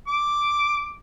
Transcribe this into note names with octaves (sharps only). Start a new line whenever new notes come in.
D6